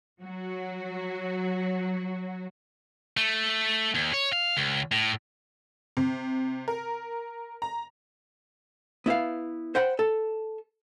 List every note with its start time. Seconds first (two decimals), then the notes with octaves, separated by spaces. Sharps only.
0.22 F#3 F#4
3.17 A3
3.95 D#2
4.13 C#5
4.32 F5
4.57 C#2
4.92 A2
5.97 C3
6.68 A#4
7.62 A#5
9.06 B3 E4 B4 F5
9.75 C5 F#5 G5 B5
9.99 A4